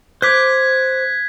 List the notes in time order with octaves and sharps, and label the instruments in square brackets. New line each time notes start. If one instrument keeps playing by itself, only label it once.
[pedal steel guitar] C5 D6 [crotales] F#6 G#6 B6